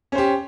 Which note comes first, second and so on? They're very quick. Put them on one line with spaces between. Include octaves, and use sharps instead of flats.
C#4 C5 G4